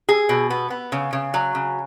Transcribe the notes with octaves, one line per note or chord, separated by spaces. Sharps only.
G#4
B2
B3
B3
C#3
C#3
F#3
C#3